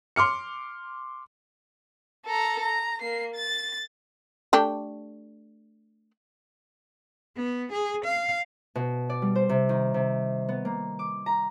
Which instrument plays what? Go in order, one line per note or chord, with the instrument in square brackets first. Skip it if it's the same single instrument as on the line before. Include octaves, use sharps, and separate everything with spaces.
[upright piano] C6 D6 F6 C#7
[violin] A4 A#5
A#5
A#3 C7
A6
[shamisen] A3 D4 G4
[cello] B3
G#4
F5
[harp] B2
D5
G3
C5
C3
D#3
C3
B3
A#3
D6
A#5